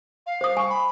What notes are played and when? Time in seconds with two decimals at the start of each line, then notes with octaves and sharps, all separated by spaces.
0.26 F5
0.41 C5 D#6
0.57 G#5 C#6
0.69 B5